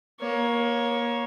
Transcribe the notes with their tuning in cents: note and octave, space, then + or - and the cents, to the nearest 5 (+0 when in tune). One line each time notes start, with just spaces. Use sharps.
A#3 +25 C#5 +0